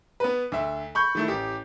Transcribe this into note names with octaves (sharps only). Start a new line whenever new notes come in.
B3 B4
D2 E5
B5 C#6 G6
D#3 A3 E4
A1 G4